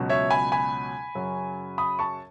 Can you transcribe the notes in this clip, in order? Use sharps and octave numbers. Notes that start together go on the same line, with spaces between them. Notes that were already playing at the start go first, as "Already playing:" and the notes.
Already playing: C#2 B2 F#3
C#5 E5
G#5 B5
G#5 B5
F#2 C#3 F#3
B5 D#6
A5 C#6